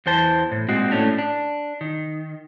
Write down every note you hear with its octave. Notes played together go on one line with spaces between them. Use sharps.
E2 E3 C5 A5
A2
A#2 G#3 C4 F#4
A2 A3 C#4 D4
D4
D#3